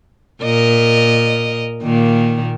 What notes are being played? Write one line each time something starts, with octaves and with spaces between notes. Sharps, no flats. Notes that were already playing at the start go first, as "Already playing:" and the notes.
A#2 A#4 D#5
A#2 D#3 A#3